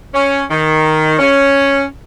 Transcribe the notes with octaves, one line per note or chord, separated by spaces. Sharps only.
C#4
D#3
C#4